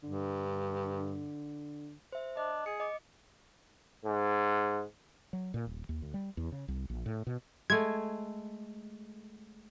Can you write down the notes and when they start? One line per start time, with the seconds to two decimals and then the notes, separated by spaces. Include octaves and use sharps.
0.03 G2 D3
2.12 C5 E5
2.37 D4 D#5
2.66 G#4 C#7
2.80 D#5 D6
4.05 G#2
5.33 F#3
5.54 A#2
5.67 D#1
5.89 D#2
6.02 D2
6.14 G3
6.37 E2
6.52 C#3
6.68 C2
6.90 A#1
7.06 A2
7.27 B2
7.70 G#3 A3 G#6